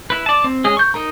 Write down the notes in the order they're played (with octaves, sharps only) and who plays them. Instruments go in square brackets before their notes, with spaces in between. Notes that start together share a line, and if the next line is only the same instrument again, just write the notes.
[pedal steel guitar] E4 B4
D5 A5
C4
G#3 C#4 G#4 D#5
C#6 G6
D#4 A#4 A#5